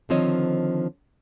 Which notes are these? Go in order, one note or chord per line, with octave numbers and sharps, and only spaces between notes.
D3 D#3 F3 C4 C#5 D#5